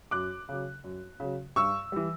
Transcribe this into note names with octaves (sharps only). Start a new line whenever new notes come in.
F#2 D6 F#6
C#3 F#3
F#2
C#3 F#3
G2 C#6 E6
E3 G3